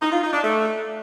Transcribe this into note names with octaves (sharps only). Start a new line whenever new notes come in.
D#4
F4
D#4
D4
A3